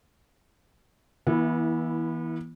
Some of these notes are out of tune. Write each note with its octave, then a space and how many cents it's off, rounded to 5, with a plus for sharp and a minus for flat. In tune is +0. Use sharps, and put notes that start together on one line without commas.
E3 -15 B3 -40 E4 +0